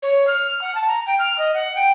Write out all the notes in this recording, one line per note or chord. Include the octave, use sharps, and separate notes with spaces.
C#5
F6
F#5
A5
A#5
G5
F6
D#5
F#5
G5